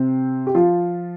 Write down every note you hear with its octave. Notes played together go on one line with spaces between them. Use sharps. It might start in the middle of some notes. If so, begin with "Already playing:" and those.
Already playing: C3 C4
G4
F3 F4